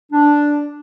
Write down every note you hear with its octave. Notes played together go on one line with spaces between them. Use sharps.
D4